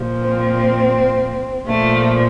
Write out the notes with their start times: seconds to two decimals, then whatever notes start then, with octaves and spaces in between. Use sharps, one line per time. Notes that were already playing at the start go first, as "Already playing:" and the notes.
Already playing: A#2 F3
0.28 C4
1.67 A#2 F3 A3